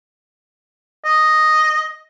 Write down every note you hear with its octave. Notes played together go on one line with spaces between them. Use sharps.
D#5